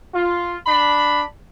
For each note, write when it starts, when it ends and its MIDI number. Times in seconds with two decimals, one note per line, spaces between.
0.14 0.55 65
0.67 1.21 62
0.67 1.21 83